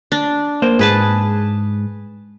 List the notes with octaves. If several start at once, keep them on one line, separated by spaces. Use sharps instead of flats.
D4
A#3 C5
G#2 G#4 B4 A5